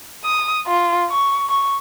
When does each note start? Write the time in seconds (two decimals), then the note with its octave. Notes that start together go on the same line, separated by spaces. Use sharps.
0.25 D#6
0.67 F4
1.11 C#6
1.49 C#6